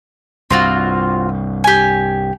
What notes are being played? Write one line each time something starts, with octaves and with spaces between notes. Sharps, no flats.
C2 G2 C4 F4 F#4
G4 G#5